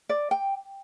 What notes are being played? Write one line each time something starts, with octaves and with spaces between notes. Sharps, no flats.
D5
G5